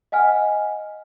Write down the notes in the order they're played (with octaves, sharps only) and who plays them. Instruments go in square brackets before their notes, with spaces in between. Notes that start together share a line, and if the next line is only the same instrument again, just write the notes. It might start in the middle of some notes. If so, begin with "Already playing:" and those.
[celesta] D#5 F#5 G#5 F6